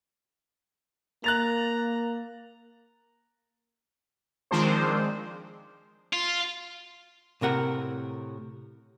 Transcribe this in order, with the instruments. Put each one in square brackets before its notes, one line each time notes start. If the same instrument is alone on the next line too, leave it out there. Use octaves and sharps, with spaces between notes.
[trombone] A#3 [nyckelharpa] A#5 [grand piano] F#6 A6 F7
[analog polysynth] D#3 F3 G#3 C4 D4 C5
[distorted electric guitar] F4
[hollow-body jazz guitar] A2 C3 A#4 F#5